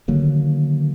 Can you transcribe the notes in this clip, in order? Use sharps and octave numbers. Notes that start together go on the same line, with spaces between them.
D3 D#3 F#3 A#3